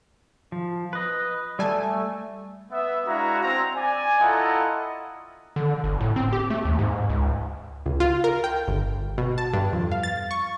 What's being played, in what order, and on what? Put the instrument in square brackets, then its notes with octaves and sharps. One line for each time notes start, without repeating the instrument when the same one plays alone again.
[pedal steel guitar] F3
B4 D#5
[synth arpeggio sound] G3 G#5 A5 [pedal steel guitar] A3
[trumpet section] B3 E5
G#3 D4 E4 F#4 F5 A#5
C4 A#5
D5 G#5
E4 F4 A4 D#5 F#5 A#5
[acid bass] D3
G1
A2
C4
G4
A3
D#2
G#2
C#2
[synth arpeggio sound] C#2
F4
A#4
G5
G1
B2
A5
G2
F2
F5
A6
C#6